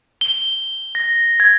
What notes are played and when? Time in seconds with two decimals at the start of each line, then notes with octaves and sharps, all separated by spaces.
0.21 G7
0.95 A#6
1.40 G#6